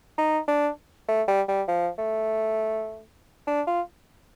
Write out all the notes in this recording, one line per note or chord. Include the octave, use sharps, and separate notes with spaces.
D#4
D4
A3
G3
G3
F3
A3
D4
F4